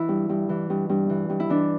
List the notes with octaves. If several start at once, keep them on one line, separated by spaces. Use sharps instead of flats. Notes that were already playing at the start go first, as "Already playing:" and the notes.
Already playing: E3 E4
G2
G2
E3
G2
G2
E3
G2
E4
E3 D4